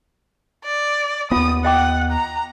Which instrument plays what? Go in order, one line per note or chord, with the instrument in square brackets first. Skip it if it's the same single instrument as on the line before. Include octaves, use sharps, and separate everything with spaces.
[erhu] D5
[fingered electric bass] D#2 B3 [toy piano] F4 [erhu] D#6
[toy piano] D#5 G5 D6 [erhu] F#5
[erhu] A#5